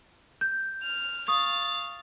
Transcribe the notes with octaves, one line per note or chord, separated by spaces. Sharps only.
G6
F6
F5 C#6 D#6 A6